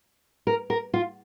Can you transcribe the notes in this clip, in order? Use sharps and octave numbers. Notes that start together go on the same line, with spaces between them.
A#4
A#4
F4